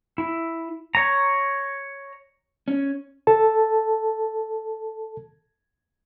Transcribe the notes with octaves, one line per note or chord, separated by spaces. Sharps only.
E4
C#5 A#5
C#4
A4 A5